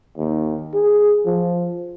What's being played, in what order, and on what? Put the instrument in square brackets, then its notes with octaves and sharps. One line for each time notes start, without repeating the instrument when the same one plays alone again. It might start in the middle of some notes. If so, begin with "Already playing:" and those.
[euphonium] D#2
G#4
F3